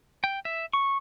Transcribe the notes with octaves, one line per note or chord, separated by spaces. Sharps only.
G5
E5
C#6